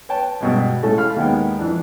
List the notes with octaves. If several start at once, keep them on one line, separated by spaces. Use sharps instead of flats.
B4 C#5 G5 A5
G2 B2 G#3
A2 G#3 A3 C#4 A4
F5 B5 F6
D#2 D#3 G#3 B3 G5
F2 E3 D4